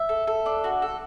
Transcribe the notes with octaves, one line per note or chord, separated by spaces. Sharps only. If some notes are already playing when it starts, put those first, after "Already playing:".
Already playing: E5
A4
A4
D4
F#4
A4